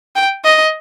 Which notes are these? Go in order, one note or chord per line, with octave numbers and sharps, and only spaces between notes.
G5
D#5